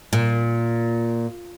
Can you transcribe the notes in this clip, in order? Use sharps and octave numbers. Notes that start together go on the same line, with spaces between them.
A#2